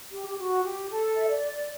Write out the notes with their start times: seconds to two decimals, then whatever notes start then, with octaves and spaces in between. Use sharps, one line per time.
0.13 G4
0.29 G4
0.38 F#4
0.64 G4
0.90 A4
1.16 E5
1.28 D5